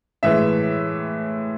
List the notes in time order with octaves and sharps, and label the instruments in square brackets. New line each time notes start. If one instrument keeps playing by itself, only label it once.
[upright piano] A2 E3 G#3 E5